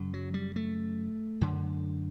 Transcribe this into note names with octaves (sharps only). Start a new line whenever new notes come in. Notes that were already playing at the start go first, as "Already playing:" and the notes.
Already playing: F#2 C#3
F#3
G3
A3
F#2 D3